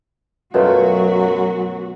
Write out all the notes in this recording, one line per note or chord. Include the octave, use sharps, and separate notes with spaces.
F#2 B2 F#3 A3 F4 F#4